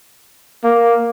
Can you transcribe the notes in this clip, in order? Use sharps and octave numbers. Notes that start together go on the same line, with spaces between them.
A#3